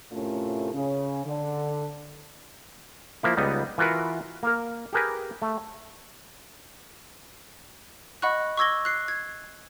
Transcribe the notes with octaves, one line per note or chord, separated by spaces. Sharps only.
A2 C3 A3 C#4 F4 A#4
C#3 C#4
D3
F3 A#3 E4
C#2 G3 B3 D#4 D#5
E3 F4 F#4 A#4 B4
A#3 A#4
G4 G#4 A#4 B4 G#5
A3
D#5 F#5 B5 C#6 F#6
C#6 D6 E6 G#6 A#6 G7
F#6 C7
G#6